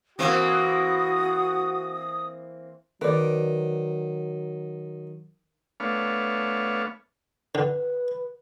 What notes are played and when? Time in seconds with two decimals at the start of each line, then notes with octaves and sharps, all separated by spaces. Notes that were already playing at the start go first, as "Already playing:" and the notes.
0.19 E3 A#3 C4 F#4 D#6
3.01 D#3 F#3 B4 D5
5.80 A3 B3 D4 C#5 F5
7.55 D3 B4